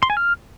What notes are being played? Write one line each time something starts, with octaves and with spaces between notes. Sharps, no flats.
C6
G#5
F6